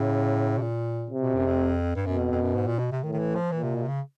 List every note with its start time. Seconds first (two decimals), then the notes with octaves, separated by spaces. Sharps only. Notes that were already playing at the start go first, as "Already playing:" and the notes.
Already playing: A2 C#3
0.58 B2
0.61 A#2
1.10 C3
1.22 B2
1.35 F#2
1.46 F2
1.95 G2
2.06 F#2 B2
2.18 F2
2.31 F2
2.42 F#2
2.55 G#2
2.67 A#2
2.79 B2
2.92 C3
3.03 A2 D#3
3.13 D#3
3.19 E3
3.35 F3
3.52 A#2 E3
3.63 C3
3.76 B2
3.82 C3
3.88 C#3